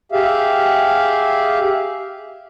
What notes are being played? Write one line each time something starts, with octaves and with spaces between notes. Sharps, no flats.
G4 G#4 E5 F5